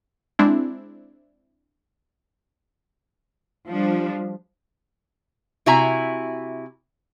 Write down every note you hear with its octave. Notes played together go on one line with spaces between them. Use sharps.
G#3 C4 D4 E4
F3 G3 D4
C3 E4 F#4 E5 G#5 A#5